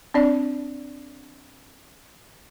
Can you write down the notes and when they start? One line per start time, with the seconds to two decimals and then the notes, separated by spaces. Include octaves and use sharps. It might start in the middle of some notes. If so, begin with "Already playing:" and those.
0.14 C4 D4 D5